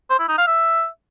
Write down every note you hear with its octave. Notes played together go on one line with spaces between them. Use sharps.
C5
E4
D#4
F5
E5